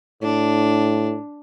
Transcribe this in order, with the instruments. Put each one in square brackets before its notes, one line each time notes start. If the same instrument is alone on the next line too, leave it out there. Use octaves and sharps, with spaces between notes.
[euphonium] A2 [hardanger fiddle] D4